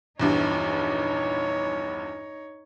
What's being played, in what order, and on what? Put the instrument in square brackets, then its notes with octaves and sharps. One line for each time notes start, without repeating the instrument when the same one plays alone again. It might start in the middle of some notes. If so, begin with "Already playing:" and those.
[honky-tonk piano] A#1 E2 G2 [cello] D#4 C#5